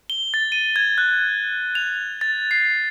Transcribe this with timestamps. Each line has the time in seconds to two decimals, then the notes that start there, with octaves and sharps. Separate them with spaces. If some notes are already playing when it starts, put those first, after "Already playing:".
0.10 G7
0.34 A6
0.52 D#7
0.76 G#6
0.98 F#6
1.75 F7
2.21 A6
2.51 C7